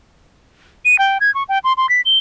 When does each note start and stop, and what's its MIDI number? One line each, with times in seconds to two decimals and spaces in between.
0.85 0.98 99
0.99 1.18 79
1.20 1.33 92
1.34 1.43 85
1.49 1.58 79
1.64 1.73 84
1.77 1.89 84
1.89 2.01 95
2.05 2.18 103